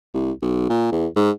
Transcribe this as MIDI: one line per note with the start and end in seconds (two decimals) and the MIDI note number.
0.14 0.31 36
0.42 0.67 35
0.69 0.88 46
0.92 1.07 40
1.16 1.31 44